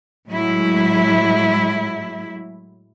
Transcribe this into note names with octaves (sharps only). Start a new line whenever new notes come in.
A2 F#3 G#3 E4